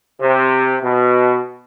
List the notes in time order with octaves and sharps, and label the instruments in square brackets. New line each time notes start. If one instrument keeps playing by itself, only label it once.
[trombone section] C3
B2